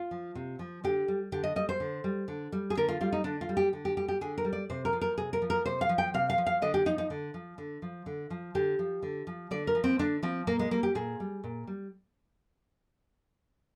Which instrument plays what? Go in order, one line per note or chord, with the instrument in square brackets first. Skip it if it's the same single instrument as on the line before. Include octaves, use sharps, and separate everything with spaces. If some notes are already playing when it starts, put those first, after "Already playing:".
Already playing: [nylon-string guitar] F4
F3
C3
F3
D3 G4
G3
D3 G4
D#5
G3 D#5
C5
D3
G3
D3
G3
G#4
D3 A#4
F4
G3 F4
D#4
D3 D4
F4
G3
G4
D3
G4
G3 G4
G4
D3 G#4
A#4
G3
D5
C3 C5
A#4
F3
A#4
C3 G#4
A#4
F3
A#4
C3 C5
F5
F3
G5
C3 F5
F5
F3
F5
D3 D#5
G4
F3 D#4
D#4
D3
F3
D3
F3
D3
F3
D3 G4
F3
D3
F3
D3 D5
A#4
F3
C4
D3 D4
F3 C4
A#2 A#3
G#3
G3 A#3
G4
A#2 G#4
G3
A#2
G3